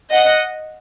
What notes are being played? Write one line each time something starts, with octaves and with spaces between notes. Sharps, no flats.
D#5 F#5